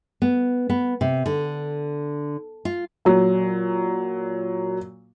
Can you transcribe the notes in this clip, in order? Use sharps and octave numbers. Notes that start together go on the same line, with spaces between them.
B3
B3
C3
D3
F4
A#2 F#3